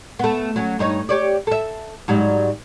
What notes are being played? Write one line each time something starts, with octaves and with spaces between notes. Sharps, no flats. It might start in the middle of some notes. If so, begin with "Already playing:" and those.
A3 B3
F#3 C#4
G2 D#4 C#5
G4 C#5 D5
A4 E5
G#2 F#3 G3